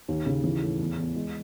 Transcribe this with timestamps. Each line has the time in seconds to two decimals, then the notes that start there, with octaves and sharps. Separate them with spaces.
0.08 D#2
0.26 C#3
0.44 E3
0.62 A2
0.79 E2
0.98 E2
1.16 G#3